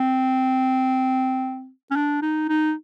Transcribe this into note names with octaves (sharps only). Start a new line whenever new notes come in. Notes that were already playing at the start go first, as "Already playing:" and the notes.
Already playing: C4
C#4
D4
D#4
D#4